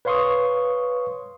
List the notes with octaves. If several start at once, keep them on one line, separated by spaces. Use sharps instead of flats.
B4 C#5 F5 C6 C#6 D#6